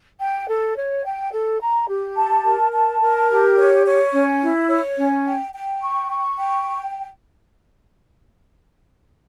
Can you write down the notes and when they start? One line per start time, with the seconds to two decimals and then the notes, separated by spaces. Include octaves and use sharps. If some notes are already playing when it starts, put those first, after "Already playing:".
0.19 G5
0.47 A4
0.75 C#5
1.04 G5
1.31 A4
1.60 A#5
1.87 G4
2.15 A5
2.43 A#4
2.72 A5
3.01 A#4
3.28 G4
3.57 C#5
3.85 C#5
4.12 C#4
4.41 E4
4.69 C#5
4.97 C#4
5.26 G5
5.53 G5
5.81 C#6
6.10 C#6
6.38 G5